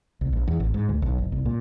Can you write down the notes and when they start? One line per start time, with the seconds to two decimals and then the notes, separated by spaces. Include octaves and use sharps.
0.21 C2
0.33 A#1
0.48 E2
0.60 A1
0.74 G#2
0.89 D2
1.02 B1
1.18 F#1
1.32 C2
1.45 A#2